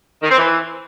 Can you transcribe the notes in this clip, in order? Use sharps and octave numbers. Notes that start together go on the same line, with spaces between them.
D#3
C4
E3